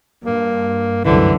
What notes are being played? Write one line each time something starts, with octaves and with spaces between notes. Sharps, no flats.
G2 A#3
C2 F#2 D3 E3 A3